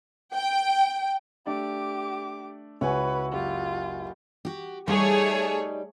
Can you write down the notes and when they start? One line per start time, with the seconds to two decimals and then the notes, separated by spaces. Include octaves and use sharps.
0.35 G5
1.46 A3 D4 G4 D5 D6
2.81 C#2 E4 F#4 B4 C#5 G#5
3.32 F#1 F4 G4
4.45 F#4 G4
4.88 G3 A3 D#4 G#4 C#5